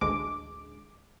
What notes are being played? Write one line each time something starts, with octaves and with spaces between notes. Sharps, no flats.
A1 D2 G#3 D6